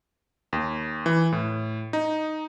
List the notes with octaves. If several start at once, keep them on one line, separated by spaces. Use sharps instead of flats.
D#2
E3
A2
D#4